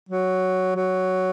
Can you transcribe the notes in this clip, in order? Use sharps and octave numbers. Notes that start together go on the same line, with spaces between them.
F#3
F#3